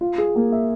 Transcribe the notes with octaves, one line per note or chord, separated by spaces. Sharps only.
F4
G#4
A#3
E5